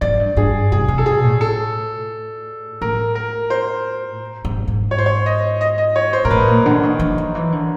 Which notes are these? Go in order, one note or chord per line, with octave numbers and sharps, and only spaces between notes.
G#2 D5
G2
G2 G#4
C3 G#4
C3
A4
B2 G#4
A2
A4
A2 A#4
A#4
C5
G#2
G#2
C#5
C5
C#5
D#5
D#5
D#5
C#5
C5
A#2 A#4
A2 B4
A#2
D3
D#3
E3
D#3
E3
D3